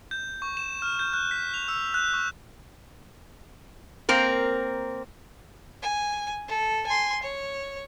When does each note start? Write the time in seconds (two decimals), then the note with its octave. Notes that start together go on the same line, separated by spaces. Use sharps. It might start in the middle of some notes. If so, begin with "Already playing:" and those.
0.11 G6
0.42 C#6
0.57 E7
0.82 F6
0.99 G6
1.13 F#6
1.31 B6
1.54 F7
1.68 E6
1.94 F#6
2.14 C#6
4.09 A#3 C4 A#4
5.82 G#5
6.48 A4
6.86 G#5 C6
7.23 C#5